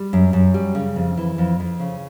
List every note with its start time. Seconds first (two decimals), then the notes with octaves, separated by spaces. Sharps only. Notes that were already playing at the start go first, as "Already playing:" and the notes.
Already playing: G3
0.13 F#2
0.33 F#2
0.54 G3
0.75 C#3
0.96 F2
1.17 E3
1.38 F2
1.60 F2
1.80 C#3